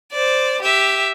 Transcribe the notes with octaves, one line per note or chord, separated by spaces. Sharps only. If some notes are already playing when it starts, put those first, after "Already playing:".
C5 D5
G4 E5